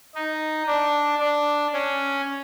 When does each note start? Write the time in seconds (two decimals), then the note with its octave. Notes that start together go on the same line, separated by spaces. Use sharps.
0.15 D#4
0.67 D4
1.20 D4
1.74 C#4